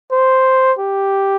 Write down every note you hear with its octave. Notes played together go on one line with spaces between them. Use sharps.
C5
G4